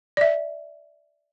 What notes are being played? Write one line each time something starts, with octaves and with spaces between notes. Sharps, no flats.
D5 E5